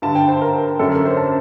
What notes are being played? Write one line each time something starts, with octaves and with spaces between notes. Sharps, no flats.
G2 D3 A5
G5
C5
A#4
F#2 D3 A4
A#4
C5
A5